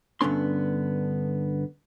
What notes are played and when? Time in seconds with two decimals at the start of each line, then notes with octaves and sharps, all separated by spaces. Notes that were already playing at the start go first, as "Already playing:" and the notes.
0.21 G2 D3 B3 C#4 C6